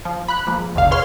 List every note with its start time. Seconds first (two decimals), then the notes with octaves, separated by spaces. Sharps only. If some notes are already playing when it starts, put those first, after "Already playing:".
0.05 F3
0.28 B5 F#6
0.47 F3 G#3 A#3
0.75 G#1 E2 B2 D3 F5
0.91 G#4 B4 C#5 C6 F6